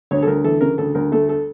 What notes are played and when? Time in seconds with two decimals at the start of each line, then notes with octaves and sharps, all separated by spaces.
0.11 D2 C#5
0.22 A4
0.27 D2 A#4
0.44 E3 A4
0.61 C#3 A#4
0.78 D2 A4
0.95 D2 A#4
1.12 A3 A4
1.29 A4